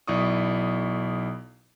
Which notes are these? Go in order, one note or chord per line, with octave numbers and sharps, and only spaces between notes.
B1 E4 D5 C#6 D#6